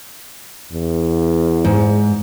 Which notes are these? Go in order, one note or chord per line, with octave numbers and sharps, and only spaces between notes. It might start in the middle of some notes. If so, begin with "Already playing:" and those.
E2
G#2